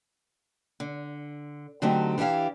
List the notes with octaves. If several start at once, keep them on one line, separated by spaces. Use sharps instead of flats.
D3
D3 F#3 A3 C4 D#4 G4
E3 D4 E4 G4 F5